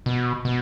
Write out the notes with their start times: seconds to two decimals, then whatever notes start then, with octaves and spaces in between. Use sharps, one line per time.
0.06 B2
0.45 B2